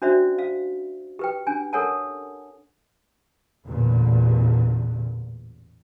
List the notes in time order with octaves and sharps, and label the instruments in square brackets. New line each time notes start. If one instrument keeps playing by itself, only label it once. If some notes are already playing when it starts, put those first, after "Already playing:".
[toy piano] C#4 D4 F#4 C5 D5 E5
F5
G4 B4 G5
C#4 D4 G#5
A4 A#4 C#5 F#5 G#5 A5
[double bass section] A1 E2 A#2 D3